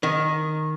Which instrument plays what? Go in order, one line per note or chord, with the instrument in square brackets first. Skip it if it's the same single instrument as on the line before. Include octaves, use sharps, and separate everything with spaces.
[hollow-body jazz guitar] D#3